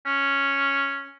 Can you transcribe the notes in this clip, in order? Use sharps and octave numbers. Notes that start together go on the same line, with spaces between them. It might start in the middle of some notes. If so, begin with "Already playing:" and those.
C#4